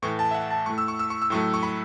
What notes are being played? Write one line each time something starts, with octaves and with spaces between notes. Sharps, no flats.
A2 E3 A3 C#6
A5
E5
F#5
A5
A2 A3 C#6
E6
C#6
E6
C#6
E6
A2 F#3 A3 C#6
C#6
B5